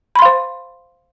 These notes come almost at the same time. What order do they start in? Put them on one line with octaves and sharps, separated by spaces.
B5 C6 F5 C5